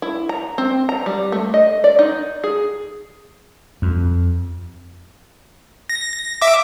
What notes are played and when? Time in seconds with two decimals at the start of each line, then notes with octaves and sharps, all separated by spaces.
0.02 E4
0.29 A#5
0.58 C4
0.89 A#5
1.06 G3
1.32 A3
1.54 D#5
1.84 D5
1.99 D#4
2.44 G#4
3.82 F2
5.89 A#6
6.42 E5 D6